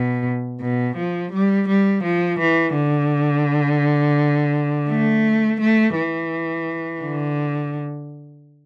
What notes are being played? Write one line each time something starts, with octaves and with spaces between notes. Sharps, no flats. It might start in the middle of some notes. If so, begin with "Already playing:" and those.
Already playing: B2
B2
F3
G3
G3
F3
E3
D3
A3
A3
E3
D3